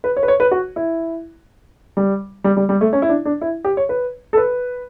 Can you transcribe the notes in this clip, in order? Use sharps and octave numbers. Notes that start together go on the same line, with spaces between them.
B4
C#5
B4
C#5
B4
F#4
E4
G3
G3
G3
G3
A3
C#4
E4
D4
D4
E4
G4
C#5
B4
A4
B4